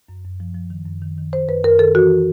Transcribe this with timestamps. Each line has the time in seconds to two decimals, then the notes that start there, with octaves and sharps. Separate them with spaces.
0.09 F#2
0.25 F#2
0.40 F3
0.55 F3
0.70 D#3
0.86 F#2
1.02 D#3
1.18 D#3
1.33 D#3 C5
1.48 F#2 B4
1.63 F#2 A#4
1.79 D#3 A4
1.95 E3 F#4